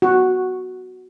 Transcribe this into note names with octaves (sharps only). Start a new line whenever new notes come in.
F#4